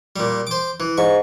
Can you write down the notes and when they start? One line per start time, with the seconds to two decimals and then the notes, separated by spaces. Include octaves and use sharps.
0.16 A#2 G3
0.47 C5 D6
0.80 E3
0.98 G#2 C#6